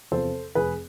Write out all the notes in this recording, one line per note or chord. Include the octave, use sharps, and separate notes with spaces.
E2 C3 F3 A4 C5
F1 G#4 B4